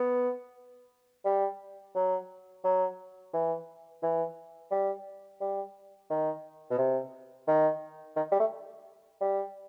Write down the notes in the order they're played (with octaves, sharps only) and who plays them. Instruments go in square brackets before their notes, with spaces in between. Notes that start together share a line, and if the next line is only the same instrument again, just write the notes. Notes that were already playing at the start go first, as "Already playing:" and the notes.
Already playing: [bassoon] B3
G3
F#3
F#3
E3
E3
G3
G3
D#3
B2
C3
D#3
D#3
G3
A3
G3